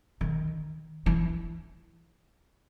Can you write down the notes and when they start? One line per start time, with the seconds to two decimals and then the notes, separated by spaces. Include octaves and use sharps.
0.21 D#3
1.06 E3